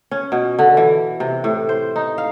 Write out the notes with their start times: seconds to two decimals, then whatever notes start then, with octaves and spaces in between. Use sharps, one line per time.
0.11 C#4
0.32 B2
0.59 D3
0.77 E3
1.20 C3
1.44 A2
1.69 C5
1.96 D#4
2.18 F5